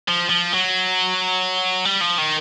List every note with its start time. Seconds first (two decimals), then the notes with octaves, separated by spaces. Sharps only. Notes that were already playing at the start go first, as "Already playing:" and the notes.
0.08 F3
0.29 F3
0.53 F#3
1.85 G3
2.01 F3
2.18 D#3